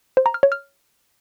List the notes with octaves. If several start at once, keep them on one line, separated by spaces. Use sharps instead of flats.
C5
A#5
F6
C#5
F6